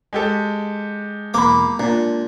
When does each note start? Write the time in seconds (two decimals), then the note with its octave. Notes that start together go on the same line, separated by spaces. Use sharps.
0.13 G#3 G4 A4
1.34 B1 E2 A#3 B5 D6
1.80 A#2 D4